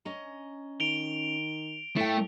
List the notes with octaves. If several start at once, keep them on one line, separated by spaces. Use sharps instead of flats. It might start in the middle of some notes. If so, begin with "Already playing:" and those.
C#4 D#5 A#5
D#3 D7 F7 G7
A2 A3 F5 G5